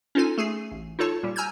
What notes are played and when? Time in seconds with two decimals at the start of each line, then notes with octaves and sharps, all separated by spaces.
0.15 C#4 D#4 F4 A4 G#5
0.38 A3 G#4 G#5 C7
0.72 A1
0.99 D#4 F4 A4 C#5 A5
1.23 A#2 G3
1.36 G#5 A#5 E6 F6 G6 G#6